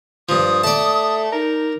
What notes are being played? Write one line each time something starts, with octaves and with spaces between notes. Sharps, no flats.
G2 F3 D#6
A3 D5 A5
D#4 A#4